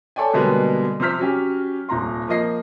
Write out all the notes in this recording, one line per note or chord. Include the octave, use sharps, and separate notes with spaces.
A4 C#5 D5 G5 G#5
B2 D3 G3 G#3 A#3 B3
C3 F3 C4 C5 F6 B6
F#3 C#4 G4
D#1 C3 A#5 C6
F3 A#3 D#5 C7